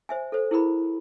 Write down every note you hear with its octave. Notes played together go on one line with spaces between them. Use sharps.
C5 E5 G#5
A4 C5
E4 G#4 A#4 B5